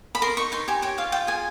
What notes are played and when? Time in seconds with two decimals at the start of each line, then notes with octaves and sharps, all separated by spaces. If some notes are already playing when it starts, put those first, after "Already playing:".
0.15 B5
0.22 A#4 C6
0.37 D#4 C#6
0.52 D#4 C6
0.68 G4 G#5
0.82 C#5 G5
0.98 F4 F5
1.12 F4 G5
1.27 G#4 G#5